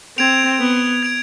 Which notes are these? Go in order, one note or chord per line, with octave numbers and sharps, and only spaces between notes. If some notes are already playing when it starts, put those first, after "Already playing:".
C4 G#6 D7 F7
B3
G#6 D7 F7